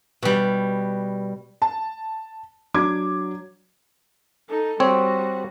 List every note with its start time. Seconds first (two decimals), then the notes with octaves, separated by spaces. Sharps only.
0.23 B2 G3
1.62 A5
2.74 F#3 D4 D6 G#6
4.49 D#4 A4
4.80 G3 C4 F#4 C#5